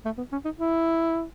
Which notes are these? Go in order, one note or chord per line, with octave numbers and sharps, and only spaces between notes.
A3
B3
C#4
D#4
E4